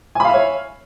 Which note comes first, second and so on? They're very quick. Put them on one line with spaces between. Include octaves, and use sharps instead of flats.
G#5 B5 F5 E5 C#5